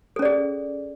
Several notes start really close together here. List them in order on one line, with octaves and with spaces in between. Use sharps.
A4 C#4 D5 G#4